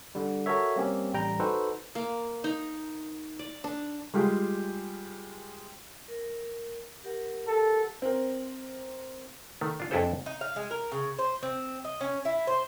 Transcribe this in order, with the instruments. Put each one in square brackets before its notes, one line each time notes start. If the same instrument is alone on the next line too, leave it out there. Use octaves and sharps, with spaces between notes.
[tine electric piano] D3 G3
F#4 A4 A#4 C#5 E5
G3 A#3 C4 C#4 G4
A1 G3 G5 A#5 G6
D#4 F#4 A4 B4 C5
[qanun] A#3
D#4
D5
D4
[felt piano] G3 G#3 F4 G4 G#4
[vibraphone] A#4
G4 A#4 F#5
[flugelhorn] A4
[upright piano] C4 A#4
[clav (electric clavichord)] D#3 A3
D4 F4
F2 D4 E4 G#4 A4 C5
[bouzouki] D#4
F5
G#3
A#4
C#3
C5
C4
D#5
C#4
E4
C5